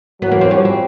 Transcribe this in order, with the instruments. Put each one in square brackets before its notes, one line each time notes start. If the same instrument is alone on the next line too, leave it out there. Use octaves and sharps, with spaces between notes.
[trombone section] E3 F#3 [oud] B3
[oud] A#3
C4
[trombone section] F3 G3 [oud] C#4
[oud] C4